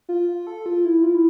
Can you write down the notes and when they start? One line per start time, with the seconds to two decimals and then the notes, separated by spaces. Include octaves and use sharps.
0.09 F4
0.29 F4
0.47 A4
0.66 F4
0.85 E4
1.03 F4
1.15 E4